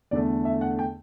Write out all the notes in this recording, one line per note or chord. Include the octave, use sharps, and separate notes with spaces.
E2 D3 A3 D5
E5
F#5
G5